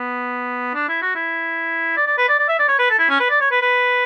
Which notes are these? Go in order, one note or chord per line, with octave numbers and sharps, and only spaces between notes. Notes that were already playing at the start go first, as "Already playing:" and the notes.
Already playing: B3
D4
E4
F#4
E4
D5
D5
B4
D5
D5
E5
D5
C#5
B4
A4
E4
C#4
B4
D5
C#5
B4
B4